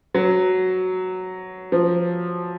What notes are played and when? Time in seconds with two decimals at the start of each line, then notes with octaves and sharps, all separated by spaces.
0.14 F#3
1.72 F3